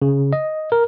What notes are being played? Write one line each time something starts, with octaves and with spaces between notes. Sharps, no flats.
C#3
D#5
A#4